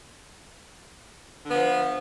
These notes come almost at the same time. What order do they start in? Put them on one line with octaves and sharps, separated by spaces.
D3 B3 F3